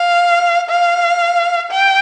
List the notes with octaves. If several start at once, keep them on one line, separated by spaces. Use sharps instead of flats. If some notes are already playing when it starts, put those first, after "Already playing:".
Already playing: F5
F5
G5